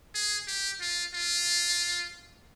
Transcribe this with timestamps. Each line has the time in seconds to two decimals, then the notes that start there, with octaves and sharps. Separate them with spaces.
0.15 G#4
0.48 G4
0.81 F4
1.14 F4